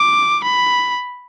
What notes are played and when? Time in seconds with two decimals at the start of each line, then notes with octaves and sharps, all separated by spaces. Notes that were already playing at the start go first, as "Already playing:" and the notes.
Already playing: D6
0.44 B5